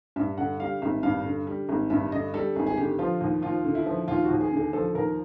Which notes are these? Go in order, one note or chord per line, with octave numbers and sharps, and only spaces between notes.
G2 E5
D3 F#5
G3 F5
G#1 E5
G2 F5
D3
G3
G#1
G2 E5
D3 D#5
G3 A4
G#1 G#4
G#4
D3 G4
F3 F4
D#2
D#2 F4
D3
E4
F3
D#2 F4
F#4
D#2
G#4
D3
G#4
F3 A4
D#2 A#4